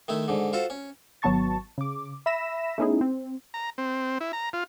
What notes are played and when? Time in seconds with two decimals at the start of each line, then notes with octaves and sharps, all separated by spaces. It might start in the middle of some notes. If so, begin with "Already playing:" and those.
0.08 D#3 A3 E4
0.28 G#2 D3
0.53 F4 F#4 A4 C5
0.70 C#4
1.22 G#1 F#3 B3 A5 C#6 A6
1.78 C#3 D6
2.26 E5 B5 E6 A#6 B6 E7
2.78 A3 B3 C#4 D#4 E4 G#4
3.01 C4
3.54 A#5
3.78 C4
4.21 E4
4.33 A#5
4.53 F4